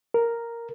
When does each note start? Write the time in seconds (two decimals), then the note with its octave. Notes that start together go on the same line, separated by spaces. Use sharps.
0.14 A#4